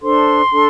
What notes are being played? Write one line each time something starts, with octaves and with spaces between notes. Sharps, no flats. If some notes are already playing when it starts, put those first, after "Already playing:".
D4 A4 C5 C6
D4 A4